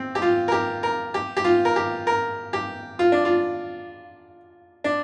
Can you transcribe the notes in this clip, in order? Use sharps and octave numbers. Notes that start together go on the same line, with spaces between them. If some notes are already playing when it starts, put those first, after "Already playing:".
Already playing: C4
G4
F4
A#4
G4
A#4
G4
G4
F4
A#4
G4
A#4
G4
F4
D4
F4
D4